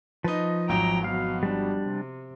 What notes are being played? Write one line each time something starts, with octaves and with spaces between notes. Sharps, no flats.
F3 D#4 B4 D#5
G#1 F#3 G5 A#5
B2 F3 F5
G3 D4
C3